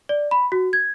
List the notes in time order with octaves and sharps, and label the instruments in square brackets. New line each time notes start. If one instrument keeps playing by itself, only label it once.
[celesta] D5
B5
F#4
G#6